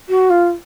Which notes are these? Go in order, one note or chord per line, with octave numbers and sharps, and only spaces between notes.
F#4
F4